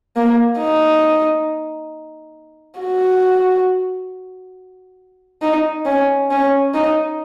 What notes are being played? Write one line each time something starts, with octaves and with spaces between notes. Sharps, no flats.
A#3
D#4
F#4
D#4
C#4
C#4
D#4